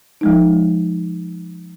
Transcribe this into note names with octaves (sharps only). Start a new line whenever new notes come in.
F3 G#3 D#4